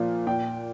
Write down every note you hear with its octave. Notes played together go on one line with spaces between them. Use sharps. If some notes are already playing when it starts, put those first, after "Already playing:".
Already playing: A#2 F3 A#3
A#2 G5